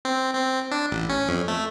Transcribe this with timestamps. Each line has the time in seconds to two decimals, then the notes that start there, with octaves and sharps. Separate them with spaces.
0.05 C4
0.35 C4
0.71 D4
0.91 A1
1.09 C#4
1.29 F2
1.48 A3